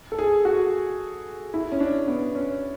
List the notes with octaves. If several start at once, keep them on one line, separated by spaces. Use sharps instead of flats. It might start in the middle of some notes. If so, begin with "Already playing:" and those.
A4
G#4
F#4
E4
C#4
D4
B3
C#4